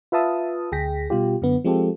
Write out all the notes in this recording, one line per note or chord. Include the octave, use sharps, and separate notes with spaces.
F4 B4 E5 F5 A5 D#6
D2 G#4 G5 A#6 B6
B2 G3 F4 G4
F#2 D3 B3
F3 G#3 C4 F4 G4 A4